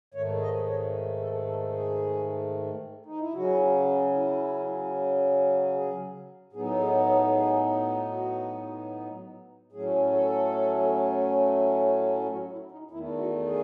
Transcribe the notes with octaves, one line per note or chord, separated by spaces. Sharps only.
G#2 D#3 A3 C#5
D#5
C#5
A4
A4
G#4
D#4
E4
C#3 F#3 C#4 F#4
E4
G#4
A2 F#3 B3 D#4 G#4
G#4
A4
G#4
F#4
A2 F#3 A3 C#4 G#4
A4
E4
F#4
E4
D#4
E2 D#3 A3 E4
F#4
G#4